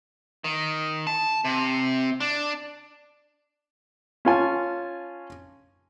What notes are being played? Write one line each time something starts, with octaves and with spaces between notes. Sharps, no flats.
D#3
A5
C3
D4
C#4 F4 G#5 A5